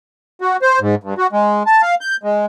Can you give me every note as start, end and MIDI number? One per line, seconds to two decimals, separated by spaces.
0.41 0.57 66
0.62 0.79 72
0.81 0.95 44
1.04 1.14 43
1.18 1.27 66
1.33 1.63 56
1.66 1.82 81
1.82 1.95 77
2.01 2.17 91
2.23 2.46 56